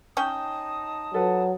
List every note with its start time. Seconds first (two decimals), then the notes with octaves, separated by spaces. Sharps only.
0.17 C#4 D#4 G5 A5 D#6
1.14 F#3 A4 B4